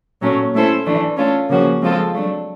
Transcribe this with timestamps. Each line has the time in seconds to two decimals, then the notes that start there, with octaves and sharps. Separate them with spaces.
0.21 A#2 F#3 A3 C#4
0.53 A3 C#4 E4 A4 C5
0.86 E3 A3 D4
1.17 A3 C#4 F4 A4
1.49 C#3 F3 A#3 C#4 F#4
1.81 F3 G#3 C4 F4 A4
2.12 F#3 A3 D4